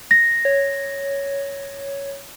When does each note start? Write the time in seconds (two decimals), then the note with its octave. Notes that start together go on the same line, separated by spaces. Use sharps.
0.11 A#6
0.45 C#5